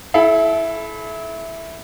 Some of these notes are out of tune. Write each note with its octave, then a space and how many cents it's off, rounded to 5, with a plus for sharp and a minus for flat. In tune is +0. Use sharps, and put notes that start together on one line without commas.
E4 +0 A4 -40